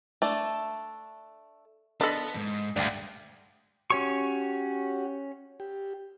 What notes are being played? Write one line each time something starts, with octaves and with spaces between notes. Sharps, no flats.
A3 D4
B3 D4 A4 D#5 B5 C6
F2 G#2
D2 G2 D5 F5 G5
C#4 F#4 G4 C#5 C#6
G4